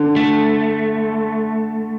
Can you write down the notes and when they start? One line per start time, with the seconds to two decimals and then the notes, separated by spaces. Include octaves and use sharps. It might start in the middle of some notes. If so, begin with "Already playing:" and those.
Already playing: D3
0.16 A3